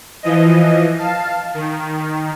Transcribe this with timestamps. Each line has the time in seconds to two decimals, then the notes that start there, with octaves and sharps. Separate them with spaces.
0.23 E3 F3 D#5
0.98 F5 A5
1.54 D#3